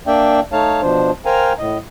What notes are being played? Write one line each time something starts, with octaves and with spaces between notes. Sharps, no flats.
A#3 D4 D5 E5 G5
A3 D#4 C#5 F5 A5
B2 F3 D4 C5
A#4 C5 F5 G5 G#5 A#5
A2 D#5